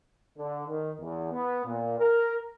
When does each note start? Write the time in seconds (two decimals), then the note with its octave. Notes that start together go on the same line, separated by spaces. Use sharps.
0.37 D3
0.67 D#3
1.00 E2
1.31 B3
1.65 A#2
1.98 A#4